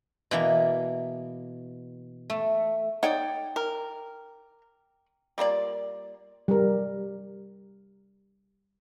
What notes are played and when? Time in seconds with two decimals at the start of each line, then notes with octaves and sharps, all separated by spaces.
0.31 B2 E3 A#3
2.30 A3
3.03 D#4 C#5 D5 F#5 G5 D#6
3.56 A#4
5.38 G3 A#3 F4 D5
6.48 G3 A#4